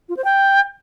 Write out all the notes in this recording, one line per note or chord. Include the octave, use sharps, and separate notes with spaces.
F4
C5
G5